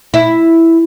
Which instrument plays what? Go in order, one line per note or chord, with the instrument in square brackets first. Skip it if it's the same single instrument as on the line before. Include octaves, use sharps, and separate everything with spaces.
[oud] E4